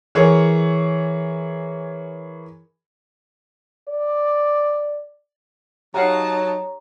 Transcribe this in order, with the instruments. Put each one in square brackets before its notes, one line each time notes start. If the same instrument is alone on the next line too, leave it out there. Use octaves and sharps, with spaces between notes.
[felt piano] E3 G#4 A#4 C#5
[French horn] D5
[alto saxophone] F#3 [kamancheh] D#4 A5 [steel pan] G4 F5 F#5 [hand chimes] C#5 A#5